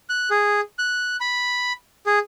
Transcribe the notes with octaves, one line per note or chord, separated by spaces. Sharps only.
F#6
G#4
F#6
B5
G#4